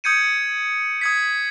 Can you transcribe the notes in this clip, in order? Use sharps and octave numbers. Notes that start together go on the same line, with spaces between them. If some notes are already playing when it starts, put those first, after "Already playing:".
D#6 G6 G#6 C#7 D#7
D#6 G#6 B6